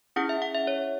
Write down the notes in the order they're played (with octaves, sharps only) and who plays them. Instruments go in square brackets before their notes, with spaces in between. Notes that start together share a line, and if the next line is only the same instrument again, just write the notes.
[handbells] C#4 E4 G#4 F#5
E5
F#5
E5
C#5